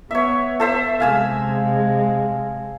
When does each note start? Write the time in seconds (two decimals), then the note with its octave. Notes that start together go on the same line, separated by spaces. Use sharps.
0.11 B3 C#5 E5
0.60 A4 C5 E5
1.00 C3 G#3 F5 G#5 E6